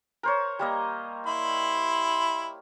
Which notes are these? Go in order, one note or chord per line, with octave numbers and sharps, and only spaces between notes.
A#4 C5 C#5
G3 A#3 D#5
E4 B5 C6